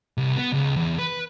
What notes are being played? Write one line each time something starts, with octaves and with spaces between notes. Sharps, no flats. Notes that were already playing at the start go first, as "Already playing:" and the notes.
C2
B3
C#2
E2
B4